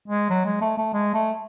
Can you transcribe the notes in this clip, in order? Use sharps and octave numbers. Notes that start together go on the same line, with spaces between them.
G#3
F#3
G#3
A3
A3
G#3
A3